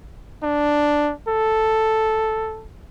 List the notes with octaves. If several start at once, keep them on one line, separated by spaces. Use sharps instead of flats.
D4
A4